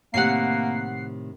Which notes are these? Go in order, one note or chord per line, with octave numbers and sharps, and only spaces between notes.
A2 C3 D#3 A#3 F#5 C7